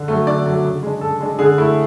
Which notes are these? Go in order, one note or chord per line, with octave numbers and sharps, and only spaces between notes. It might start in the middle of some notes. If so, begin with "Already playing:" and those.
Already playing: D3
F#3 A3
D3 D5
F#3 A3
C#3
G#3 D4
C#3 A4
G#3 D4
D3 G#4
A3 E4